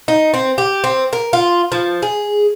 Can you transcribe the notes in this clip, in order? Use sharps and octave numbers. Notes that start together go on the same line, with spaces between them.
D#4
C4
G4
C4
A#4
F4
F3
G#4